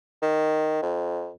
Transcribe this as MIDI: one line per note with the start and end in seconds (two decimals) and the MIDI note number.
0.22 0.78 51
0.82 1.31 41